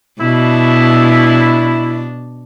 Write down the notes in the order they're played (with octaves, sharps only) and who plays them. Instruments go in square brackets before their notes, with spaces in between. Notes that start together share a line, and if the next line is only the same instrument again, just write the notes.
[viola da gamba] B2 D4 [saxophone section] E4